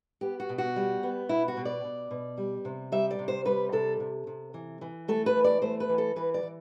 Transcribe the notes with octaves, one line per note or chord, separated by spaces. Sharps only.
B3 G4
F#4
B2
F#4
G3
B3
B2 E4
F#4
B2
D5
B2
B2
G3
C3
G3 E5
D5
C3
C5
G3 B4
C3 A4
C3
C3
E3
E3
A3 A4
B4
E3
D5
A3 C5
B4
E3
A4
E3 B4
D5
E3